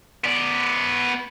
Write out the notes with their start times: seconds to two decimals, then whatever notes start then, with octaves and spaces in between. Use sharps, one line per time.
0.24 B3 D5